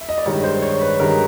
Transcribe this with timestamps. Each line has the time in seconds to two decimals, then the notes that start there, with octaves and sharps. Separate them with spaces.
0.01 E5
0.09 D#5
0.18 D5
0.25 G2 D#3 G#3 C#5
0.44 C5
0.62 C#5
0.81 B4
0.99 G2 D#3 G#3 A#4